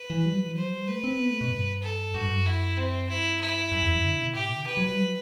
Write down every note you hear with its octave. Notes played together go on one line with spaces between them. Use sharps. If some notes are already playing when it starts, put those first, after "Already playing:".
Already playing: B4
E3
G3
F#3
E3
F#3 C5
G3
A3 B4
C4
B3
A3
B2
G2
A4
G2 F#4
G2
F#2
E4
C4
G2 E4
E4
F#2
E2
F#2
D3
B2
A2 G4
B2
D3
C3 B4
F#3
G3
F#3